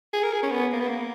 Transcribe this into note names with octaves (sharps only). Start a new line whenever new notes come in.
G#4
A#4
G#4
C#4
B3
A#3
B3
A#3